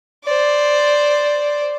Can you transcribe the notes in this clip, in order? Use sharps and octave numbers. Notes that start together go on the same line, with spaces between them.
C5 D5